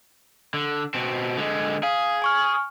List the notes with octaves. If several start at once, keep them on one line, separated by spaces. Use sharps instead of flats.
D3
B2 C4
D3 G#3
G#4 F5
G#5 C#6 F6